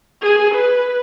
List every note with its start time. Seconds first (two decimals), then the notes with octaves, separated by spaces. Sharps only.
0.22 G#4
0.55 B4